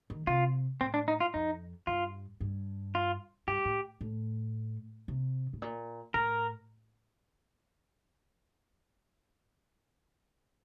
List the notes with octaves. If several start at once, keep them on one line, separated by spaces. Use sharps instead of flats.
D#3
C3 F4
A2 C4
D4
D#4
F4
F2 D#4
G2 F4
G2
F4
G2 G4
A2
A2
C3
A2
A#2
A2 A#4